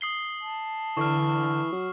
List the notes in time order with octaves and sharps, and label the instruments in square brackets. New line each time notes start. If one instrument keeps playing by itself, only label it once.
[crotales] D#6 C7 G7
[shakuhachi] A5
[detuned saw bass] D3 [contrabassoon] E3 [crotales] C#6 F6
[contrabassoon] F#3